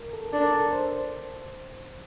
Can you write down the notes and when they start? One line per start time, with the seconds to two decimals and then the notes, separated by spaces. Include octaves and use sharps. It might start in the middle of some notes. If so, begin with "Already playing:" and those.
Already playing: A#4
0.13 A4
0.33 D4 A4
0.42 A#4
0.52 A4
0.72 C5